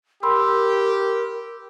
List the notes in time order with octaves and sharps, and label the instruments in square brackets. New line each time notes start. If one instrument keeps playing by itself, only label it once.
[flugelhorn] G4 [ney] A#4 [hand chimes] B5 C6 E6